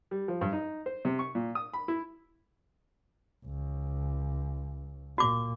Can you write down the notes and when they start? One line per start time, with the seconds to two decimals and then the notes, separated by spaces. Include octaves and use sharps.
0.11 G3
0.28 F3
0.41 G2
0.53 D#4
0.86 C5
1.05 C3
1.19 C#6
1.35 A#2
1.55 D#6
1.74 B5
1.88 E4
3.45 C#2
5.18 A#2 F#4 D6